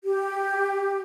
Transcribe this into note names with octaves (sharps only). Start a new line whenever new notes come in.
G4